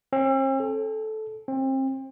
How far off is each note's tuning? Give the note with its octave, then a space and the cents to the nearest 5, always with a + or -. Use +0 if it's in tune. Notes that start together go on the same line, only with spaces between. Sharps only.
C4 +45
A4 -15
C4 +30